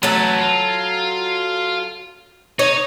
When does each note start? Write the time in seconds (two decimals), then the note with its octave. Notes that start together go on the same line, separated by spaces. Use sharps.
0.03 F#3 A3 A4 B4
0.40 F4
2.59 D#4 C#5